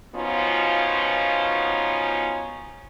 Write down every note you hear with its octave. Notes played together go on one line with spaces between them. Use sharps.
B2 F3 B3 C#4 D#4 F4